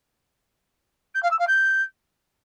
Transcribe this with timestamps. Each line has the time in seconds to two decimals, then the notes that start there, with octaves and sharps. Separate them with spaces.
1.14 G6
1.22 F5
1.31 E6
1.39 F5
1.47 G6